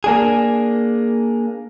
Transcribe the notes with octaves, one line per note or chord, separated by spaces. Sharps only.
A#3 D4 G#4